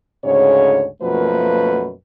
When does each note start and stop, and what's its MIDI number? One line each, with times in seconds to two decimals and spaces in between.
0.25 0.87 38
0.25 0.87 44
0.25 0.87 49
0.25 0.87 73
1.02 1.92 42
1.02 1.92 47
1.02 1.92 53
1.02 1.92 57
1.02 1.92 58
1.02 1.92 71